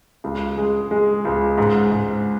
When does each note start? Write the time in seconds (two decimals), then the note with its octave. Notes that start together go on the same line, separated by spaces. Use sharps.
0.24 C#2
0.57 G#3
0.91 G#3
1.25 C#2
1.58 G#2
1.92 G#2